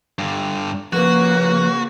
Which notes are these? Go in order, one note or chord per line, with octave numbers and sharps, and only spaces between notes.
G2 D3
C#3 F3 A#3 F#4 B4